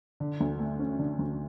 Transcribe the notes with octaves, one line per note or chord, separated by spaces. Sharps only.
D3
D2
A3
C#4
D3
D2